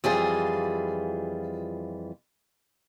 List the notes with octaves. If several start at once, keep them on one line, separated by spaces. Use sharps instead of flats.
F2 E3 G3 F4 G#4